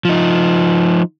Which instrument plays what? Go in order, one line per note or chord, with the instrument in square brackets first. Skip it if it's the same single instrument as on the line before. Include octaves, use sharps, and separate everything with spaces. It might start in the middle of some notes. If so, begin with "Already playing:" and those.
[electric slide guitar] F3 D#4